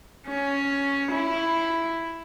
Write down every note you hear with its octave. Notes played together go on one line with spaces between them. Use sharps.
C#4
E4